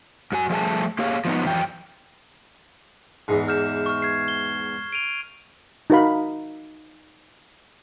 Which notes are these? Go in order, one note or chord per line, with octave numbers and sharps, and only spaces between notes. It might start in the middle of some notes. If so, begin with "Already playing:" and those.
F#2 F#4 G#5
F3 G3 A3 G#4 G#5 A5
A#3 G4 G#4 C#5 F5
F3 B3 D#4
F2 E3 F#3 G5
E2 G#2
F6 G6 E7
C#6 F6
G#6 C7
G7
D7 D#7 F7
D#4 F#4 A#4 F5 B5